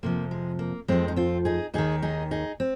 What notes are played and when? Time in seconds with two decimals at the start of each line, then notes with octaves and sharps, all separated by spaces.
0.03 F2 C3 F3 A#3
0.31 G#3
0.59 A#3
0.88 F2 F3 G#3 C4
1.08 D#4
1.16 C4 F4
1.45 D#4 G#4
1.74 D#2 D#3 D#4 G#4
2.02 D#4 G#4
2.31 D#4 G#4
2.60 C4